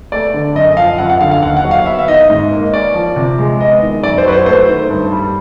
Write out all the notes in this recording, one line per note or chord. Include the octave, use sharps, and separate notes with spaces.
A3 D5
D3
F#2 D#5
F3 F5
F#2 F#5
F#5
D3 F5
F5
D#2 F#5
F#5
F#3
F5
B3 E5
E5
D#3 D#5
G#2
A#3
C#4 D5
F3
C3
G#3
B3 D#5
D#3
F#2 D5
C5
F#3 B4
C5
A3 C5
D#3
G2
G3